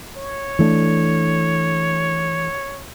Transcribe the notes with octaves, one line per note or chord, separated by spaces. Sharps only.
C#5
E3 A3 D4